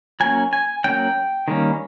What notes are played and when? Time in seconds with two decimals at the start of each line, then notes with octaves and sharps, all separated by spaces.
0.20 F#3 A#3 C#4 G#5
0.53 G#5
0.84 F#3 A#3 C#4 G5
1.48 D#3 G3 A#3 C#4